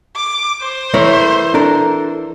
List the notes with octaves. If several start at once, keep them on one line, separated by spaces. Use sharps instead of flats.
D6
C5
E3 A3 A#4 C#5
D4 A4 A#4